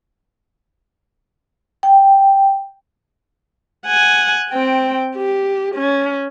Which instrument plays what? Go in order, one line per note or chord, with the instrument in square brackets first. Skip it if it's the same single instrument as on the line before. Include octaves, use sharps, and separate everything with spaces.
[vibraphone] G5
[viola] F#5 G#5
C4 G5
G4
C#4